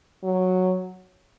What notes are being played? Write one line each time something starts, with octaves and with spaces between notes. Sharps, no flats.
F#3